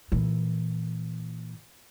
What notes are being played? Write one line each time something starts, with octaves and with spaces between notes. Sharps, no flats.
A#2 E3